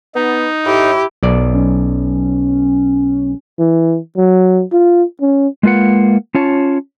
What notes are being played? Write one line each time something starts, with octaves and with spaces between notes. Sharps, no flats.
B3 D#4
A2 E4 G4
B1 D5
C#4
E3
F#3
F4
C#4
G#3 A#3 F4 B4 F#5
C#4 F4 C#5 A5